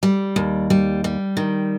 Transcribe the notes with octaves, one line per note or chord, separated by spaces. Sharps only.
G3
D#2
G3
G3
D#3